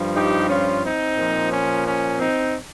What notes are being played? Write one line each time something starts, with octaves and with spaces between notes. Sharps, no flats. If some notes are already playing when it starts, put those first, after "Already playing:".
Already playing: G2 F3
D#4 G4
C#4 F4
C4 D#4
A#2 F3
C#4
C#4
C4 D#4